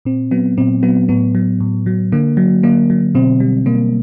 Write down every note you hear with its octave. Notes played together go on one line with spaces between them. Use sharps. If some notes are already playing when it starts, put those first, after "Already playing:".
A#2 C4
F#3 B3
A#2 C4
F#3 B3
A2 B3
F#3
A2
F#3
D3 A#3
F#3
D3 A#3
F#3
B2 C4
G3
B2 A#3